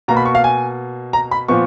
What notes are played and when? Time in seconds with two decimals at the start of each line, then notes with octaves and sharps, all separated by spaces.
0.08 B2 A#3 A#5
0.17 B5
0.26 C#6
0.35 F5
0.44 G#5
1.13 A#5
1.31 B5
1.48 A#2 F3 B3 C#6